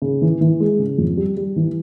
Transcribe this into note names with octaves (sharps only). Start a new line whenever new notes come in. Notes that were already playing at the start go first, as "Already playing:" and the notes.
C#3
E3
E3
G#3
C#3
F2
G3
G3
E3